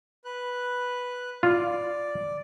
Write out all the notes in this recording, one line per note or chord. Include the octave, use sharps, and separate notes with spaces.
B4 F#6
F4 D5